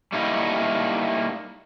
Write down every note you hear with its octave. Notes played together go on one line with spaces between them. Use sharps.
G3 A3 A#3 D#4 E4